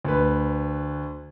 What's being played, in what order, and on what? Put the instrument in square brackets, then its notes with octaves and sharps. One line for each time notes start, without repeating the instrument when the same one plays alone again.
[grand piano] D2 B4